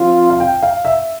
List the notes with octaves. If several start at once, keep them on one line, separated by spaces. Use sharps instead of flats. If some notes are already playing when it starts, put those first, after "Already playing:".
Already playing: F3 C4 F4
F5
G5
F5
E5